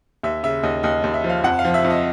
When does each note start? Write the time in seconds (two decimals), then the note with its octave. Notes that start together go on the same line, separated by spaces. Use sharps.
0.23 D#2 E5
0.43 C#3 E5
0.63 D#2 D#5
0.83 D#2 D#5
1.04 D#2
1.14 E5
1.24 F3
1.29 F5
1.44 F2 F#5
1.59 F5
1.65 F3
1.74 E5
1.84 F2
1.90 D#5